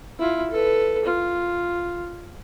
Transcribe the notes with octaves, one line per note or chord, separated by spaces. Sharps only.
E4 F4
A4 B4
F4